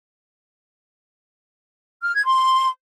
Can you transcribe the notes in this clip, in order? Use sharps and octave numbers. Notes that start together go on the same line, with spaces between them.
F6
G#6
C6